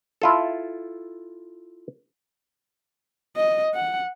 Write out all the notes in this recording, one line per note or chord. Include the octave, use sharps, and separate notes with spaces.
E4 F4 A4
D#5
F#5